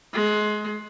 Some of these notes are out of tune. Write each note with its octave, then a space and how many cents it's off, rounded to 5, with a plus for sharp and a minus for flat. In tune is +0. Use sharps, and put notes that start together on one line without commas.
G#3 +25